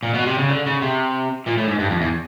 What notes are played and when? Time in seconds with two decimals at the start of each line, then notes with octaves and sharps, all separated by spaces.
0.03 A#2
0.14 B2
0.26 C3
0.38 C#3
0.49 D3
0.66 C#3
0.82 C3
1.47 A#2
1.58 A2
1.68 G#2
1.79 G2
1.90 F2
2.01 E2